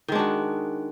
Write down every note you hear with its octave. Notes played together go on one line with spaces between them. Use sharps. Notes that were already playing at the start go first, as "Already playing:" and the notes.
D#3 G#3 D4 F#4